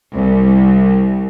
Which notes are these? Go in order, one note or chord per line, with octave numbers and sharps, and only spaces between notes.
C2